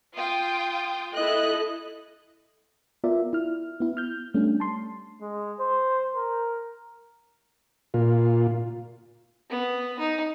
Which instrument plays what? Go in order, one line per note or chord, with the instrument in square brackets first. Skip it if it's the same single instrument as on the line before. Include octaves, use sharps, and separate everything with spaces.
[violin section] F4 G5 D#6
[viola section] E4 A4 D#5 [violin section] F#6
[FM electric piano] B3 F4 A#4 D5 E5
E4 F6
B3 E4
F6 G6
G3 A3 C#4 D4
A5 C6
[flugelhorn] G#3
C5
A#4
[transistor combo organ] A#2 F4
[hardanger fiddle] B3
D#4